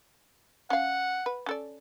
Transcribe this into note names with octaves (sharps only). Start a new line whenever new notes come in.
C#4 F5 F#5
B4
C#4 A4 D5